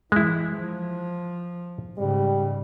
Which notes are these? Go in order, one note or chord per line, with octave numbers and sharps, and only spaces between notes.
E3 G#3 E4
F3
G#2 C#3 G3